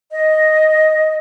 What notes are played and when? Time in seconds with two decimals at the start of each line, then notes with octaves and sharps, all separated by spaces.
0.11 D#5